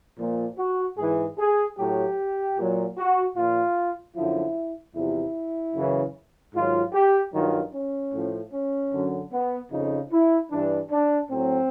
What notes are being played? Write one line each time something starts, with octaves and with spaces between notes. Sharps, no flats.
A#2 F3
F#4
G#2 E3 G#4
G#4
A2 F#3 G4
A#2 F#3
F#4
A#2 F3 F4
F#2 D3 F3 E4
E2 C3 F3 E4
F#2 C#3 E3
G#2 D#3 F#3 F4
G4
G2 D#3 F#3 F4
C#4
A2 F3
C#4
F#2 D3 F#3
B3
F2 C#3 F3 D#4
E4
G2 E3 D4
D4
A2 F#3 C4